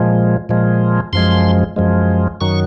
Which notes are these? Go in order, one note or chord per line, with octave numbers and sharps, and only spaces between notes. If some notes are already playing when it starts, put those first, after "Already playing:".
Already playing: A#2 F3 G#3
A#2 F3 G#3
F#2 F3 G#3 C6
F#2 F3 G#3
F#2 D#3 F#3 C#6